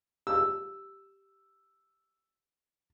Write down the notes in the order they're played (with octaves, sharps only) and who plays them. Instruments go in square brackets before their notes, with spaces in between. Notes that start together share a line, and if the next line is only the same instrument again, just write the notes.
[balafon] G4 [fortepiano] E6